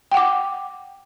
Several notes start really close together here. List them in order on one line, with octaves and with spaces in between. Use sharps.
G5 F#5 D6